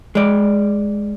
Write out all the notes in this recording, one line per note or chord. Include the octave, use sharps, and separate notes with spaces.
G#3 D5